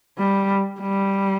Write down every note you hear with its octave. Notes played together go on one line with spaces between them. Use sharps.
G3
G3